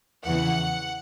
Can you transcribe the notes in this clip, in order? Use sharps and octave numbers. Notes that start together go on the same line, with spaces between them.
E2 C#3 E3 F#5